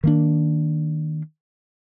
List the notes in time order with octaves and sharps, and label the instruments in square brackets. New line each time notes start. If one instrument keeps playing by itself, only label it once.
[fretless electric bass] D#3 A#3 D4